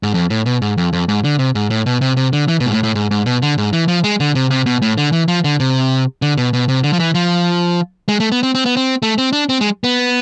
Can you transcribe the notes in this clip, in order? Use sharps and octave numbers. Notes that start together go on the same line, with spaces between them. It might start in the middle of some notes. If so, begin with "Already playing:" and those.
G#2
F2
A2
B2
G#2
F2
F2
G#2
D3
C3
G#2
A2
B2
C3
C3
D3
E3
B2
G#2
A2
A2
G#2
G#2
B2
D3
G#2
E3
F3
G#3
D3
C3
C3
B2
A2
D3
E3
F3
D3
C3
D3
B2
B2
C3
D3
F3
E3
F3
G#3
A3
B3
C4
C4
B3
C4
A3
C4
D4
C4
G#3
B3